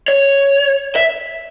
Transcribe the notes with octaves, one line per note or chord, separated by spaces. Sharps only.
C#5
E5